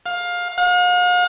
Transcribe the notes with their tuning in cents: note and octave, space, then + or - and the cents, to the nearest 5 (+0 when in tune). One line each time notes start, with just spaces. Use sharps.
F5 +20
F5 +45